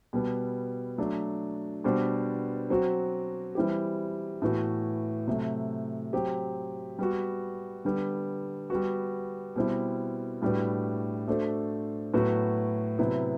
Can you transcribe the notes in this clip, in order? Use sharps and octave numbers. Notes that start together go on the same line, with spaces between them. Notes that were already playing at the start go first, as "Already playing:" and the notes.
B2 G3 B3
F#3 A3 D4
B2 G3 D4 F#4 C5
F#3 C4 F#4
E3 G3 C4 E4 G4
A2 E3 B3 F#4
C3 F#3 A3
F#3 C4 G4
G3 B3 F#4
D3 G3 B3
G3 B3 F#4
B2 G3 C4 E4
A2 G3 D4 F#4 B4
A3 D4 F#4 A4 C5
A2 F#3 B3 F#4
C3 F#3 B3 E4